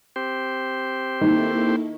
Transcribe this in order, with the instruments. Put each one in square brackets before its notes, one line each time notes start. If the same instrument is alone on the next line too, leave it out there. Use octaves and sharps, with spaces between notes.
[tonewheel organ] C4 G4 C5
[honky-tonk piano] D#3 [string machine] A#3 E4 A4